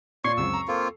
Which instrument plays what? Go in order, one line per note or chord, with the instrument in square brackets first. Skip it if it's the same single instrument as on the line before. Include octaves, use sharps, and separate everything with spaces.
[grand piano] A#2 D5 C7 [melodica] C#5 C6 [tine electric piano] C#6
[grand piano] C#2 F#2 C4 [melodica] E6
[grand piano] A#5
[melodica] A#3 C4 F4 [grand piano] A4